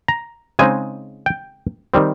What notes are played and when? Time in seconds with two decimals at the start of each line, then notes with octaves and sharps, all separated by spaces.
0.08 A#5
0.59 C#3 G#3 C4 D#4 G#5
1.26 G5
1.94 D#3 G3 C4